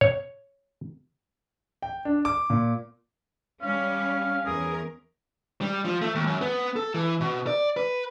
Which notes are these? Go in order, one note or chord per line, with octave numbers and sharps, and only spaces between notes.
C#5
G5
D4
D6
A#2
G3 C#4 F5
E2 C#4 G#4 A#4
G3
F3
A3
D#2
F#2
B3
A4
E3
B2
D5
B4